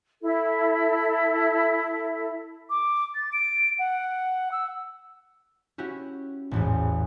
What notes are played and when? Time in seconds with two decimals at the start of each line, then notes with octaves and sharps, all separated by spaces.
0.22 E4 A4
2.70 D6
3.15 A6
3.33 D7
3.79 F#5
4.52 E6
5.78 C#4 E4 F#4 G4
6.51 A1 E2 G#2